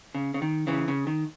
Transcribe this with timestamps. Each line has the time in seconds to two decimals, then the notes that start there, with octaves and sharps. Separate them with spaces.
0.15 C#3
0.34 C#3
0.42 D#3
0.67 C#3 E3
0.88 C#3
1.07 D#3